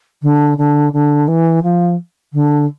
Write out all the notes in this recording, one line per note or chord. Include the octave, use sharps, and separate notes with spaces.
D3
D3
D3
E3
F3
D3